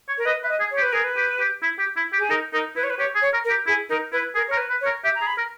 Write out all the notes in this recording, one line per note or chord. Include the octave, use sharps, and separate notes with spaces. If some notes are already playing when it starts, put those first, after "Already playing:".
C#5
A#4
B4 D#5
B4 E5
D#5
G#4
C#5
G4
B4
G#4 A#4
B4
G4
G4
E4
G4
E4
G4
G#4
D#4 A#4
D#4 A#4
E4 B4
C#5
B4
G4 C#5
G#4
C#5
A#4
A#4
G4
E4 G#4
D#4 A#4
E4 B4
G#4 A#4
A#4 C#5
B4
B4
C#5
A#4
G4 E5
A#5
G#4
B5
A#4